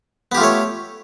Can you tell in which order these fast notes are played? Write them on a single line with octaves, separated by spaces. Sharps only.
B3 G4 F4 A3 C#5